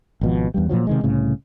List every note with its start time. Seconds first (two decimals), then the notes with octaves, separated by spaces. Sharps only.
0.21 G#1 B2 F3
0.54 E2 G2 G3
0.69 A#2 C#3 F3 F#3
0.87 C3 D#3 G#3
1.04 C2 A2 C#3